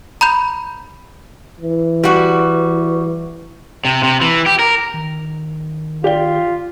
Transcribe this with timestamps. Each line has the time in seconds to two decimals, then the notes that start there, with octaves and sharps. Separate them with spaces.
0.21 A#5 B5 G6
1.60 E3
2.04 G3 F#4
3.85 C3
4.03 C3
4.21 E3
4.46 G4
4.59 A#4
4.94 D#3
6.04 F4 G4 D5 G7